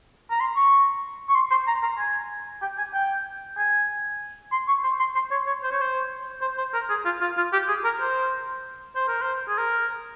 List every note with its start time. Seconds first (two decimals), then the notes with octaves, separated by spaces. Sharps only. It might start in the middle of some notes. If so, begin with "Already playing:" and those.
0.31 A#5
0.40 C6
0.56 C#6
1.29 C#6
1.35 C6
1.51 C6
1.67 A#5
1.83 A#5
1.98 G#5
2.62 G5
2.78 G#5
2.94 G5
3.57 G#5
4.52 C6
4.68 C#6
4.84 C6
5.00 C6
5.15 C6
5.31 C#5
5.47 C#5
5.63 C5
5.71 C#5
5.81 C5
6.41 C5
6.58 C5
6.74 A#4
6.89 G#4
7.05 F4
7.21 F4
7.37 F4
7.53 G4
7.68 G#4
7.84 A#4
8.00 C5
8.96 C5
9.08 A#4
9.22 C5
9.48 G#4
9.58 A#4